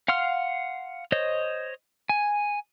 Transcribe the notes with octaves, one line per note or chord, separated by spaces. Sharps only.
F5 F#5 C6 F6
C5 C#5 D#5
G#5